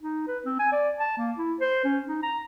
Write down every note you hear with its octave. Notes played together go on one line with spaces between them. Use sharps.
D#4
B4
C4
G#5
D5
A5
A#3
E4
C5
C#4
D#4
A#5